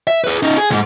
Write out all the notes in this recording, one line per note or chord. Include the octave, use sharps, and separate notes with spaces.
E5
G#4 B4
C#4 D#4
G#4
C#2 G#2